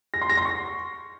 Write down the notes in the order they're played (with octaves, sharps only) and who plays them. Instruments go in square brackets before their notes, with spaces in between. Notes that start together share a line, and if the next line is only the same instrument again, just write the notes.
[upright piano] A#6
C6
A#6
C6
C#6